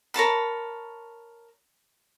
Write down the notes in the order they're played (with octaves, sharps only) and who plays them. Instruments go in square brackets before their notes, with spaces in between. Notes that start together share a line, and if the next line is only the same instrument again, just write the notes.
[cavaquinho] A#4 C#5 A5 B5